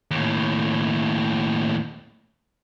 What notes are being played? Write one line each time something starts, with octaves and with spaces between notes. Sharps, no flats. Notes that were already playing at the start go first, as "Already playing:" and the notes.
D#2 A2